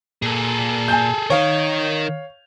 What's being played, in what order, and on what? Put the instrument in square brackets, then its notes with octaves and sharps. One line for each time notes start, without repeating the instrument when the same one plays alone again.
[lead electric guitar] A#2 [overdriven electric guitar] G#4 A4
[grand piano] G#5 A5 G6
[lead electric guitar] D#3 D#4 [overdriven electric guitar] A#4 D#5 [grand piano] C#5 F5